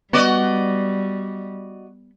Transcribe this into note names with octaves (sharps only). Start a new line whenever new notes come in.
G3 B3 F#4 D5 D#5